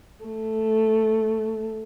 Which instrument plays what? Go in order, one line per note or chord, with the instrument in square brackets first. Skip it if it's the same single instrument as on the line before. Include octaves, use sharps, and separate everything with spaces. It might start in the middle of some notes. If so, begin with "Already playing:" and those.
[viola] A3